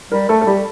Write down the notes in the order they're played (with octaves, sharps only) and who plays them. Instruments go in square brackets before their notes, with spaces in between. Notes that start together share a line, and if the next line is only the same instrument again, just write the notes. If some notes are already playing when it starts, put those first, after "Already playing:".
[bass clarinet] G3 [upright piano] A#4
[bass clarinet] A3 [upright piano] A4
[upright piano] A4
[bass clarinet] G3 [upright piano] G4